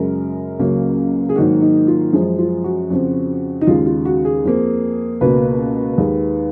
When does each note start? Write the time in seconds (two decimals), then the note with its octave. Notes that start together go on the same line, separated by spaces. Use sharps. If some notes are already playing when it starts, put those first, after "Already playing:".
Already playing: F#2 C#3 G#3 A#4
0.59 C#2 C#3 F#3 A#3
1.29 G#4
1.36 G#2 D#3 F#3 A#3 F#4
1.62 D#4
1.87 F4
2.13 F#2 F3 G#3 F4
2.38 F4
2.64 F#4
2.90 F2 C#3 F3
3.61 D#4
3.67 D#2 C#3 G#3 F4
3.86 F4
4.05 F#4
4.25 G#4
4.44 F2 F3 A#3
5.21 C#2 B2 A#3 B4
5.98 D#2 D#3 G#3